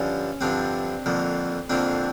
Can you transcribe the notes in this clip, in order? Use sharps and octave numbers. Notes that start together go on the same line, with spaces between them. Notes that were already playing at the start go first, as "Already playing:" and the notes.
Already playing: G2 D3 F3 C#4
G2 D3 F3 C4 D4
F2 D3 F3 A#3
F2 D3 F3 A#3 C4 D4